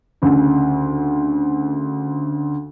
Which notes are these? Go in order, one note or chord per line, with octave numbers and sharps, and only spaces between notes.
D2 C#3